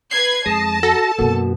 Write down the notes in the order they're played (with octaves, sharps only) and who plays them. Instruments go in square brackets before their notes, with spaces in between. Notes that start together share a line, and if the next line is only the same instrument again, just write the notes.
[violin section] B4 G#6 [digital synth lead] C7
[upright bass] F2 [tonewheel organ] G#3 D#6 A#6 [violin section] A5
[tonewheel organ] F#4 A#5 A#6 [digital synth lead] A4
[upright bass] F#2 B2 [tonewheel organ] A#3 F#4